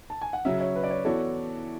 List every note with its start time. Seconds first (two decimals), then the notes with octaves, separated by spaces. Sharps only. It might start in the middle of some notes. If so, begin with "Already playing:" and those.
0.10 A5
0.21 G#5
0.33 F#5
0.45 C#3 F#3 C#4 E5
0.60 C#5
0.75 B4
0.84 D5
0.90 C#5
1.05 E3 B3 F#4 A4 C#5